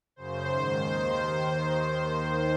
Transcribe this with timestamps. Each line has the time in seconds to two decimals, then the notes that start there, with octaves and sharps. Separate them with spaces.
0.16 F#2 C#3 C5
0.48 G#2 D#3
0.81 D#2 D#3